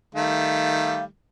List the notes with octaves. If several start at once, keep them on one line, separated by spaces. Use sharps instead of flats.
D#3 G3 A3 F5